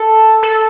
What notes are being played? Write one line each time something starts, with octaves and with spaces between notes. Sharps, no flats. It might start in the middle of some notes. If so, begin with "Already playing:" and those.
Already playing: A4
A4